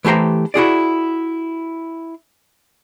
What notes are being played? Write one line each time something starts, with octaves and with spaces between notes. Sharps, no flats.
E3 A3 G4 C5 A#5
E4 F#4 G#4 D5